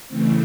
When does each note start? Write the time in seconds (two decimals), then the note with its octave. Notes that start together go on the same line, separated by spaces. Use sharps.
0.08 C#3 E3 A3 C4